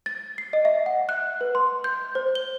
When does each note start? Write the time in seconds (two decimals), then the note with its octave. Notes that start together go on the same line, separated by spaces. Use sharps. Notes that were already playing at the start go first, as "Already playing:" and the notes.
0.06 A6
0.38 C7
0.53 D#5
0.65 E5
0.86 F#5
1.09 F#6
1.41 B4
1.55 C6
1.84 G6
2.15 C5
2.35 G7